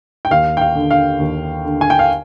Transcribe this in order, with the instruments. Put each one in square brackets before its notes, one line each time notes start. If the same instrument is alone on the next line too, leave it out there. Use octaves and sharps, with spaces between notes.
[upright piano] G5
D#2 F5
G5
F5
D3
F5
D#2
D3
G#5
G5
F5